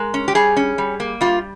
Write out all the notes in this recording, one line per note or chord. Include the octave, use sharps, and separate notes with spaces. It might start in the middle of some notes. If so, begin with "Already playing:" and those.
Already playing: G#3 A#4
C#4
G4
G3 G#4
C#4
G3
A#3
G3 F4